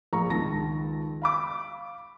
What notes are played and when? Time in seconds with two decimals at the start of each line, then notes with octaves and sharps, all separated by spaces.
0.13 A#1 A#5 C#6
0.30 C#2 D#3 A5 A#6
1.22 F5 B5 D6